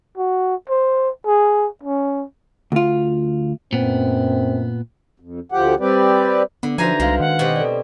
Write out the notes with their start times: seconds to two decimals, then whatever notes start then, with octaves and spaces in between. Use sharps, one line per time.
0.18 F#4
0.69 C5
1.27 G#4
1.83 C#4
2.72 D2 F4
3.73 F#2 A#2 B3 C4
5.20 F2
5.52 D2 F3 G4 F#5
5.80 G3 C4 G4 B4 D5
6.63 D3 B3
6.78 F3 D#4 F#4 B4 C5 E5 G#5 A#5
7.00 C2 G#3 F#4 F5
7.20 D#3 F#5
7.39 B2 C4 G4 D#5
7.56 A4 D5